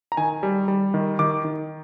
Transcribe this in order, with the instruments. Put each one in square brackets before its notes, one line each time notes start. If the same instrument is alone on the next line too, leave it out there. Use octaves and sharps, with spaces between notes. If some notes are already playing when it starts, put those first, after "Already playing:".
[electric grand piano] A#5
D#3 G#5
G3
G3
D#3
D#3 D6
D#3